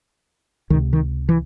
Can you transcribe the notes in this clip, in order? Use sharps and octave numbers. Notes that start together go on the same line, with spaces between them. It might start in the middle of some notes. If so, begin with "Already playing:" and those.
C#2 C3 D#3
D#3
E3